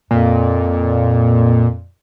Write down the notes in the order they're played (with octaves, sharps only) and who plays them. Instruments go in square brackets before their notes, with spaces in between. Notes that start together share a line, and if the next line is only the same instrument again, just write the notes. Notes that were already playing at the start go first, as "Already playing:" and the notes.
[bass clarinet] F2 [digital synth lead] A#2